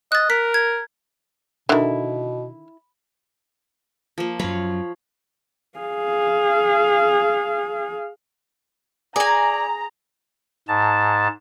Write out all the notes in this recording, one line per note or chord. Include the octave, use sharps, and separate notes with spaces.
D#5 F#6 A6
A#4 B6
G#6
B2 D3 D#3 E4
F3 A#3
F#2 F#3 C#5 F5 B5
G#4 F5
G#4 D5 G#5 A#5
G#2 A5